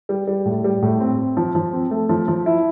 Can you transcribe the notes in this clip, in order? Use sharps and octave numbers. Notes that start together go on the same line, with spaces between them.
G3
G3
A2
G3
A2
C4
C4
F3
F3
C4
A3
F3
F3
E4